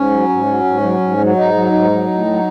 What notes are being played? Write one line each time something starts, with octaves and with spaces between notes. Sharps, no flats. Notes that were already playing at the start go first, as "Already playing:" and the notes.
Already playing: G#2 C#4
F#3
G#2
F#3
G#2
F#3
G#2
F#3
G#2 D#4
F#3
G#2
F#3
A2
F#3